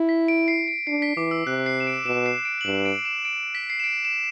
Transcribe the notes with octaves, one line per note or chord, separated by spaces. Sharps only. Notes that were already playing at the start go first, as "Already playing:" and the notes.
Already playing: E4
B6
D7
C7
D7
D4 C7
B6
E3 D6
E6
C3 F#6
C7
E7
D7
B2 E7
C7
D7
F#7
G2 E7
D7
E7
D7
B6
C7
E7
D7
E7